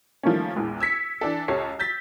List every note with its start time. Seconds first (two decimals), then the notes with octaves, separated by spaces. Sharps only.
0.23 D#3 F3 G3 A3 A#3 C#4
0.56 A#1 E2 E3 G#3
0.80 E6 G#6 B6 C#7
1.21 E3 D4 A4
1.48 C#2 G4 A4 C#5 C7
1.79 E6 G6 A6 B6